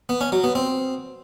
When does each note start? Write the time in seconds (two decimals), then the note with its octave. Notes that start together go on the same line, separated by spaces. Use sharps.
0.09 B3
0.21 C#4
0.32 F#3
0.44 B3
0.55 C4